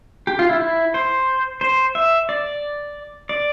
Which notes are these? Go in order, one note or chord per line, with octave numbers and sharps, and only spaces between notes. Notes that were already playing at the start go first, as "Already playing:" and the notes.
G4
F4
E4
E4
C5
C5
E5
D5
D5